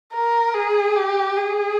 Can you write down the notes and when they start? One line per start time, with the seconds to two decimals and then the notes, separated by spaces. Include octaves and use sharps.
0.13 A#4
0.55 G#4
0.96 G4
1.36 G#4